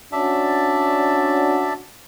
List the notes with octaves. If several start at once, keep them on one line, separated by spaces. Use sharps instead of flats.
C#4 D4 F#4 D5 E5 A5